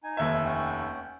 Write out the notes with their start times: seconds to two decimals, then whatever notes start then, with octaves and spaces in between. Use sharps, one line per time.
0.04 D#4 G#5
0.17 F1 D#2 E5
0.45 C#4 F#5 G5